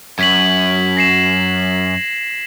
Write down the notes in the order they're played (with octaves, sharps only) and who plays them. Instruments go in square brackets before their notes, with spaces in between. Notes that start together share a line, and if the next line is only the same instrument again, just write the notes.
[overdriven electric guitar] F#2 [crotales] G#6 B6 F#7
[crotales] A#6 C7 E7